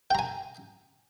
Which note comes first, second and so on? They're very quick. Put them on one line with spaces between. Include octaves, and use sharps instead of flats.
G5 A#5 G#5